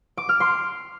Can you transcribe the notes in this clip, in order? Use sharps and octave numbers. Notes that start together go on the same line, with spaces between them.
D6
F6
C6